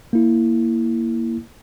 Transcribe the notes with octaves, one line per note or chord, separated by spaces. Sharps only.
A#3 E4